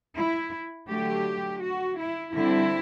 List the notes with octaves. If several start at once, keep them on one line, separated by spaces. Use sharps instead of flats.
E4
D3 F#3 A3 G4
F#4
E4
D3 G3 C4 E4